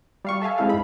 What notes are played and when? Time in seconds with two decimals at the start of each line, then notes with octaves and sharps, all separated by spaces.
0.25 G3 F5 C#6
0.42 A4 E5 F5 G#5
0.58 G#3 C4 E4 A4 F5
0.69 G#2 B5